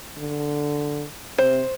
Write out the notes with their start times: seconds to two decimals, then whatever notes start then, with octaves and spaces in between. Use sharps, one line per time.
0.18 D3
1.38 C3 C5